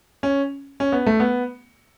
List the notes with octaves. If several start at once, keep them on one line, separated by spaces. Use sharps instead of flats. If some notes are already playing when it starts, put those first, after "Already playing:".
C#4
C#4
B3
A3
B3